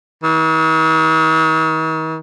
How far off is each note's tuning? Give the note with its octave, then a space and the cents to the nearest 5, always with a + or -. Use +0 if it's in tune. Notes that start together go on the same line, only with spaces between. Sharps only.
D#3 +45